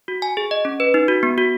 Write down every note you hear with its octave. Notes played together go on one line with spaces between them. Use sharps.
F#4
G#5
G#4
D#5
C#4
B4
D#4
F#4
B3
F#4